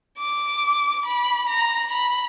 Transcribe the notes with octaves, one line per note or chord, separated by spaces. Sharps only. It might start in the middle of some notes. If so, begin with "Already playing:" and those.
D6
B5
A#5
B5